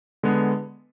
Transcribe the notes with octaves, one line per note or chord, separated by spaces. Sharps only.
D3 G#3 B3